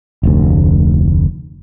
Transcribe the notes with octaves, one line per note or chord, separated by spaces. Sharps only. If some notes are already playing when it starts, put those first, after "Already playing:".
F1 D2